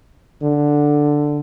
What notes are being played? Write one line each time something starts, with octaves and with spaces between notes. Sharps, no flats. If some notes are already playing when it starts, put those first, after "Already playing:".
D3